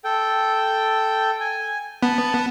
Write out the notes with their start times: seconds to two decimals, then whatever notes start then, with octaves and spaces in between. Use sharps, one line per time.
0.04 A4 G5
1.40 G#5
2.03 B3 A5